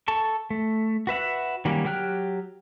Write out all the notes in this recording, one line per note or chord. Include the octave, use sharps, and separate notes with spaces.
A4 A5 C#6
A3
F#4 B4 E5 F#5
D#3 F#3 G3 A#3 C#4
F#3 G4 G5 F6 F#6